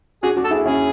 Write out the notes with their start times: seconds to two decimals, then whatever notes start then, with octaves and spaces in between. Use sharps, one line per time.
0.23 D4 F#4 G#4
0.37 D4 F#4
0.44 A4
0.51 E4 G#4
0.66 C#4 E4 G#4